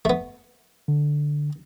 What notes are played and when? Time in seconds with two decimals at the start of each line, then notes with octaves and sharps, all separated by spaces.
0.05 A3 B3
0.88 D3